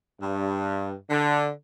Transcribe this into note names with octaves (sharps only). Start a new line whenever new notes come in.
G2
D3